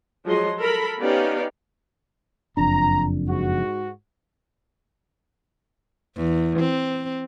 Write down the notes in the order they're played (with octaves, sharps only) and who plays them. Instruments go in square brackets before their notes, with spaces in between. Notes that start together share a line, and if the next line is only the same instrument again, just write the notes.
[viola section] F3 F#3 G#3 G#4 D#5 C6
A4 A#4 B5
B3 C#4 D#4 G4 D5 F5
[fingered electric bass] F#1 F2 D4 [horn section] A#5
[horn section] G#2 F#4
[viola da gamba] E2
C4